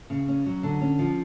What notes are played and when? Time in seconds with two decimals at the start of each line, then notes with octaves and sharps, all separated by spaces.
0.10 C#3
0.28 C#4
0.46 F#3
0.63 D3
0.81 C#4
0.99 F3